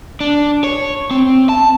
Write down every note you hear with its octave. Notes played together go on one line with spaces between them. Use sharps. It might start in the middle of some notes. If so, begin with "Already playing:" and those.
D4
C#5
C4
A5